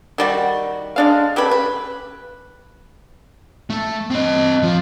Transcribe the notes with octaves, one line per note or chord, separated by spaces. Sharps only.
D#3 G3 F#4
G#3 D4 F5
C#3 G4 A4 B4
B4
A3
C4 D#5
F3